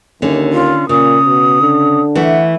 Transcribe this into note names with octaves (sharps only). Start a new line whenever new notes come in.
D#2 D3 C#4
F4
A#2 C#3 D#6
B2
D3
E3 A3 F#5